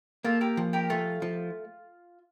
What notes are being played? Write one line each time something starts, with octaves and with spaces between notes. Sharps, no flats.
A#3 F4 A4
G4 A#4
F3
G4 A#4
A3 F4
F3